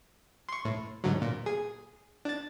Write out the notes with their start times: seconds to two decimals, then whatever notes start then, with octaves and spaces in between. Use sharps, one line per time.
0.49 C6 C#6
0.65 A2
1.04 G#2 D3 F#3
1.22 A#2
1.46 G#4
2.25 D4 A6